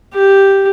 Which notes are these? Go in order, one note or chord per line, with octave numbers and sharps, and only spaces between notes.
G4